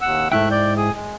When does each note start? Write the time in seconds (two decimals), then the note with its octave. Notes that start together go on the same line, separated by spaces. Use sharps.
0.01 D#2 F#5 E6
0.32 G#2 A3 E4 E5 G5 F#6
0.51 D5 G6
0.77 G#4 D#6
0.94 G#3